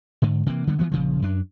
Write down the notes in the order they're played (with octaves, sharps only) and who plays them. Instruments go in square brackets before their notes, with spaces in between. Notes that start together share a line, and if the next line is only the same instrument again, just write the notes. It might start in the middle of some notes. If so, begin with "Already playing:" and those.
[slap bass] G#2 D3
C3 E3 A#3
D3 G3 B3
E3 F3 B3
A#1 C#3 F3
F#2 D4